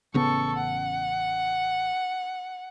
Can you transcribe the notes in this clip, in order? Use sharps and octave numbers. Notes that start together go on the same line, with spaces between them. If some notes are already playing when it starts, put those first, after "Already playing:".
A1 C#3 B3 A4 C#6
F#5